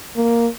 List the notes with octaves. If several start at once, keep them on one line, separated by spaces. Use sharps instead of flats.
A#3